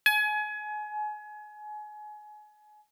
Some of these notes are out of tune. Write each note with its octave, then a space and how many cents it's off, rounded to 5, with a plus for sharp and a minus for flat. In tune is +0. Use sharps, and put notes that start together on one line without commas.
G#5 +30